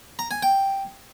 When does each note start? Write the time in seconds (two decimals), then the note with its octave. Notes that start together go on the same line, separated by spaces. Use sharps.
0.19 A#5
0.31 G#5
0.43 G5